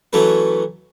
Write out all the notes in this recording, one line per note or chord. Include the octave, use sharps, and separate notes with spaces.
E3 F#3 A3 C#4 B4